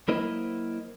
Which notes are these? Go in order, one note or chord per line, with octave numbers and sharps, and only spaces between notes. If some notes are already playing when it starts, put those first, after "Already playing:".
F#3 A#3 E4 A#4 C5 D#5